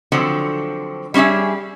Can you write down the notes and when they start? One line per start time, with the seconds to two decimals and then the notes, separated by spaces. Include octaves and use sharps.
0.12 D3 F3 F#3 C4
1.14 G3 C#4 D4 G#4 E5